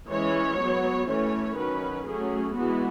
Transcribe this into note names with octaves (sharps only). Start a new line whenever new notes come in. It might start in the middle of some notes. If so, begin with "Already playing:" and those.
E3 G#3 C#4 C#5
F#3 B3
E3 A3 C#4 C#5
D#3 F#3 C#4 B4
F#3 A3 C#4 G#4
E3 G#3 B3 F#4